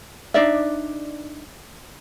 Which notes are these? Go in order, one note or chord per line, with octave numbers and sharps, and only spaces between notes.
D4 D#4 D5 E5